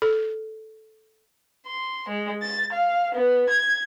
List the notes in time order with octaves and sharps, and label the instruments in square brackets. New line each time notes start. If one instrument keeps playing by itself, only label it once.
[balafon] A4
[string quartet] C6
G#3
A6
F5
B3
G#6